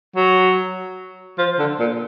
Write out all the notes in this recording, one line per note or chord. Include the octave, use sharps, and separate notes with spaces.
F#3
F3
D3
A#2